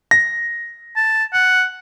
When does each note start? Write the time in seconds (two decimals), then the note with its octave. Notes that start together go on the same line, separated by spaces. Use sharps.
0.11 A#6
0.96 A5
1.33 F#5